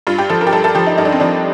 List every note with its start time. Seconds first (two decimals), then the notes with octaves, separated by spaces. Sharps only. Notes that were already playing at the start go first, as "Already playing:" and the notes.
0.07 G2 F4
0.18 G4
0.30 F3 A4
0.41 A#4
0.47 G4
0.52 G2 A4
0.64 A4
0.75 F3 G4
0.87 D#4
0.98 G2 D#4
1.05 D4
1.12 C4
1.20 F3 D4